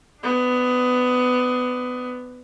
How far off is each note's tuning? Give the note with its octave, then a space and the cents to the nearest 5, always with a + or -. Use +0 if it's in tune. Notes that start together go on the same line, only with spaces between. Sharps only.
B3 +20 D4 +20